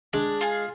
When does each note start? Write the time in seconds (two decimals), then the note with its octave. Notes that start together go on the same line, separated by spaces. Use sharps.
0.13 G#3 D4
0.41 F4 G#4